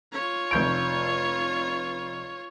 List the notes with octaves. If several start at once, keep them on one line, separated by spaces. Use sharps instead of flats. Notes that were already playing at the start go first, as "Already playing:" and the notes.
F4 C#5
F1 G6 D7